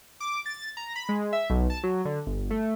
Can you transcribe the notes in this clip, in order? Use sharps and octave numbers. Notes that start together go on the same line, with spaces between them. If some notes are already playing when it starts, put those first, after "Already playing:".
D6
A6
A#5
B5
G#3
E5
B1
A5
F#3
D3
G1
A3